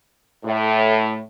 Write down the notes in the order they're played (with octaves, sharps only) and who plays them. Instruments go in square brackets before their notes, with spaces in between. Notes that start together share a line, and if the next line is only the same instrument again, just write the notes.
[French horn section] A2